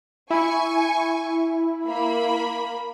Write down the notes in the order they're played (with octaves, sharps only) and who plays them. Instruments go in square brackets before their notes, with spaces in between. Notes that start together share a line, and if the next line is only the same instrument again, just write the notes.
[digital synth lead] E4 [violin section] G#5 C#6
[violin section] A#3 B5